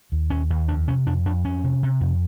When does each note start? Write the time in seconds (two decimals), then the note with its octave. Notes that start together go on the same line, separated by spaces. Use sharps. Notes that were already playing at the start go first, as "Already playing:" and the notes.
0.12 D#2
0.30 D#2 C#4
0.50 D#2
0.68 F2 D4
0.88 C3 C#4
1.07 F2 D4
1.26 F2 D4
1.44 F2 C#4
1.64 C3
1.83 C3
2.01 F2